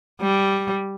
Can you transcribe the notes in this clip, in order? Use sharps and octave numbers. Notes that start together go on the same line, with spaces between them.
G3